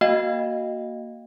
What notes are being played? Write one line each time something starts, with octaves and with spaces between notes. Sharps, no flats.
A#3 F#4 D#5 F5 G5